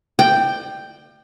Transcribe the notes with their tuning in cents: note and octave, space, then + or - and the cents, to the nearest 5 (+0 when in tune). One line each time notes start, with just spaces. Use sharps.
D5 +30 G5 +0